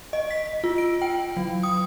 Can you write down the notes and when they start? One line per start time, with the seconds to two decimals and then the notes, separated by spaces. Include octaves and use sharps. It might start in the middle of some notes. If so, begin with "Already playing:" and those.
0.13 D#5
0.31 B6
0.64 F4
0.78 D7
1.02 G5
1.37 F#3
1.63 D#6